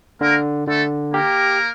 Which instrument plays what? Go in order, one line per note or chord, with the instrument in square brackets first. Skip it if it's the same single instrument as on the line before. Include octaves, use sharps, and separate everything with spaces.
[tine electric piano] D3 [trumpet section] A#3 A#4
[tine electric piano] D3 [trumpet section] A3 A4
[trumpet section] A#3 A#4 [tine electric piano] G4